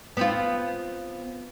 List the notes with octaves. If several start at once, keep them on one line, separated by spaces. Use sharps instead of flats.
B3 C4 F4